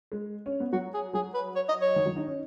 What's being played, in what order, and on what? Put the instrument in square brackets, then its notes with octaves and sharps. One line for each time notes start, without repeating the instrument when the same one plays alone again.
[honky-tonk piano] G#3
C#4
B3
[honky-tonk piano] F#3 [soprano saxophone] F#4
[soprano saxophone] G#4
[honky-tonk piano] F#3 [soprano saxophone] G#4
[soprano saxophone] B4
C#5
D#5
C#5
[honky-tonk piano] D#3
F#3
D#4
C#4